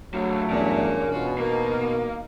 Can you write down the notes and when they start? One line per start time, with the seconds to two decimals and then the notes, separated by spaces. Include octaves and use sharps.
0.14 F#3 A3 D4 F4
0.50 E2 G2 C#4 A#4 C#5 D5
1.09 B2 F4 F#4
1.38 A#3 D#4 A#4